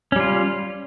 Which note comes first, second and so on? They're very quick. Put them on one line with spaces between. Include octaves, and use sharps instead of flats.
C#4 G3 F4